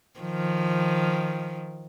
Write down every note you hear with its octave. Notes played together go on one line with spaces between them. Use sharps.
D#3 F3